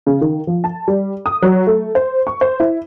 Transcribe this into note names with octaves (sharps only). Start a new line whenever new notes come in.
C#3
D#3
F3
A5
G3
D#6
F#3
A3
C5
C#6
C5
E4